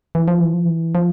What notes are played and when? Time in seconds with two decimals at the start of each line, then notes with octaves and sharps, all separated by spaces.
0.15 E3
0.28 F3
0.40 E3
0.54 F3
0.65 E3
0.95 F3